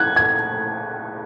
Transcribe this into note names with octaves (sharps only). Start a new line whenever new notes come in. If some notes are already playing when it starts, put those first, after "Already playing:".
Already playing: F#6 G#6
G#6